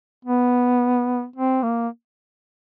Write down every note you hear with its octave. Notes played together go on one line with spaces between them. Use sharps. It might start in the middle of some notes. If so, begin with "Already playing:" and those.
B3
C4
A#3